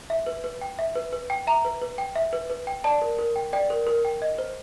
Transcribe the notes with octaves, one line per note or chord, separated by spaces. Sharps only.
E5
B4
B4
G5
E5
B4
B4
G5
E5 A#5
B4
B4
G5
E5
B4
B4
G5
D5 A5
A#4
A#4
G5
D5 G5
A#4
A#4
G5
D#5
C5